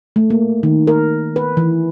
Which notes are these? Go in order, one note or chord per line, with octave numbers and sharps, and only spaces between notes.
A3
A#3
D#3
A#4
B4
E3